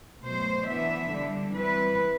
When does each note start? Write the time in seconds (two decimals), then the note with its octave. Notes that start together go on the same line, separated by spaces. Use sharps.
0.24 B2 F#3 A3 C5
0.67 E3 B3 D4 E5
1.11 D3 G3 D4
1.55 E3 G3 C4 E4 B4